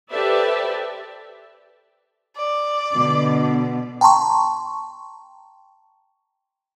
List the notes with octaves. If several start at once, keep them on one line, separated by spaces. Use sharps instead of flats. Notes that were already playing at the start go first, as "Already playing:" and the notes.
G4 A4 B4 C5 D5 E5
D5
B2 D3
G5 A5 A#5 C6 C#6